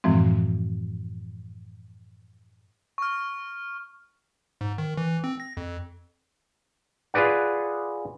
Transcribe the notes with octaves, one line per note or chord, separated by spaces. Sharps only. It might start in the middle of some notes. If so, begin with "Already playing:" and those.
F#2 A2 E3 F3 G#3 C4
C#6 F6
G#2
D#3
E3
C4
A#6
F2
F4 G#4 B4 D5 F#5